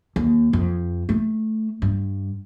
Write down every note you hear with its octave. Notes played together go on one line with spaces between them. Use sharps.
D#2
F2
A3
G2